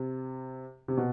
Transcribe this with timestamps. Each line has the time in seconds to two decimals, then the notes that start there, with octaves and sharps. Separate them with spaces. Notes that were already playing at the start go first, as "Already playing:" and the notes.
Already playing: C3
0.88 C3
0.97 B2